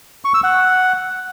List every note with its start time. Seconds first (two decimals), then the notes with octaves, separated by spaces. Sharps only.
0.25 C#6
0.34 E6
0.44 F#5